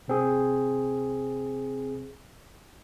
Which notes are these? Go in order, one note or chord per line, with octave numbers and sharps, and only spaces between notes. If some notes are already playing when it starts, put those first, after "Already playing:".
C3 C4 G#4